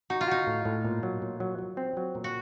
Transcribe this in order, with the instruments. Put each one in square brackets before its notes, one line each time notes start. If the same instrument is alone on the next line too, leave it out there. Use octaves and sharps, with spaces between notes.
[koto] D#4 [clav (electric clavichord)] F#4
[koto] F4
[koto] D#4 [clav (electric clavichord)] F#4
[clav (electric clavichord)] A2
A2
A#2
F#3
A#2
F#3
F#3
C4
F#3
A#2
[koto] F#4